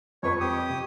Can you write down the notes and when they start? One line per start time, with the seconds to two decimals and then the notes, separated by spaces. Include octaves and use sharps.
0.23 F2 B4 C#5 C#6
0.40 G4 D#6
0.69 C3